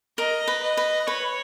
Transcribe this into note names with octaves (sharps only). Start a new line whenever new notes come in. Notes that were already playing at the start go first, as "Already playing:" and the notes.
A#4 D#5
B4
D#5
B4
B4 C#5